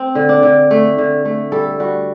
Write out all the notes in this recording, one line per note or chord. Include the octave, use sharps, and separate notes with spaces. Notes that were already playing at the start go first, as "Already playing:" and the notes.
Already playing: C4
D3
D4
D3
A3
D3
A3
G3 A4
G3 F#4